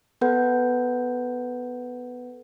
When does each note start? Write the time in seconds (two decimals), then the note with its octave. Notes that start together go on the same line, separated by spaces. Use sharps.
0.21 B3 A4 B4 F#5 G6